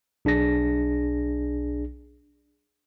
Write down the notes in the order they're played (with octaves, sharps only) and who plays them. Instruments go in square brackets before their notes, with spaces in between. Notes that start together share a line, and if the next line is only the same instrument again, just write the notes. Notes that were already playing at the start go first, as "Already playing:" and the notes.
[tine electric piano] B1 D4 G#4 A#6